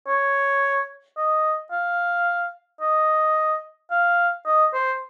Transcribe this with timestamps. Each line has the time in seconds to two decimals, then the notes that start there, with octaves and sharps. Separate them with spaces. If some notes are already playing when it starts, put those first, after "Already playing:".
0.07 C#5
1.17 D#5
1.71 F5
2.81 D#5
3.91 F5
4.46 D#5
4.74 C5